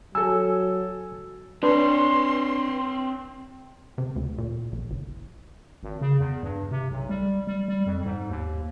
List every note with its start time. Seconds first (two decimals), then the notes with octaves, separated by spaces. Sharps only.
0.15 F#3 A4 G#5 E6
1.63 C4 D4 B4 C#5 C6
3.98 C3
4.16 D2
4.38 A#2
4.72 A#1
4.90 G1
5.83 G#1
6.01 C#3
6.19 E2
6.43 G2
6.71 C3
6.91 B1
7.09 G3
7.47 G3
7.68 G3
7.86 F2
8.05 G#2
8.30 D#2